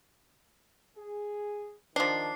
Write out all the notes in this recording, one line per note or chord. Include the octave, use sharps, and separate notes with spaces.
G#4
D#3 F3 D4 C7